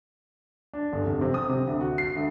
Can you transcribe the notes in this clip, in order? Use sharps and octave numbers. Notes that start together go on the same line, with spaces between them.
D4
G1
F1
C3
D#6
C3
D2
F#4
C7
D2